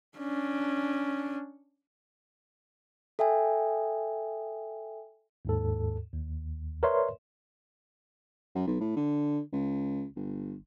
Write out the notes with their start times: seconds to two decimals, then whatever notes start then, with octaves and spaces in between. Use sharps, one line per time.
0.18 C#4 D4
3.19 A4 E5 G5 G#5
5.45 D#2 G#2 A4
6.13 D#2
6.83 A#4 B4 C#5 D5 E5 C6
8.55 F#2
8.67 B1
8.80 A2
8.96 D3
9.53 C#2
10.16 G1